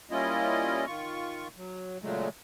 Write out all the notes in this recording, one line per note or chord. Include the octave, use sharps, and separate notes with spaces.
G3 A#3 C#4 E4 F4 D#5
D#3 F4 C#6
F#3
A#2 C#3 F#3 G#3 A3